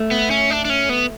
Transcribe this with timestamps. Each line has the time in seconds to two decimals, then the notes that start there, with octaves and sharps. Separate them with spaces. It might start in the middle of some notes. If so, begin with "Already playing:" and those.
Already playing: A3
0.11 B3
0.31 C#4
0.50 D4
0.65 D4
0.70 C#4
0.89 B3